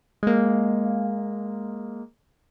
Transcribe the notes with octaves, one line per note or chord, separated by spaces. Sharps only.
G#3 A#3